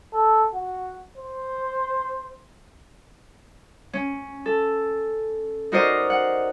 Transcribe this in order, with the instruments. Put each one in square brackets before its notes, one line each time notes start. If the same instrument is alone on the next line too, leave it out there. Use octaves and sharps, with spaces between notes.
[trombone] A4
F#4
C5
[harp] C#4
A4
D#4 F#4 A#4 C5 D5 D#5
F#5